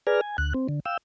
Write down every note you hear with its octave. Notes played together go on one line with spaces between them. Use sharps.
G#4 B4 D5 G#5 A#5 F6
G#5
D2 F#6
C4
D3
F5 G5 E6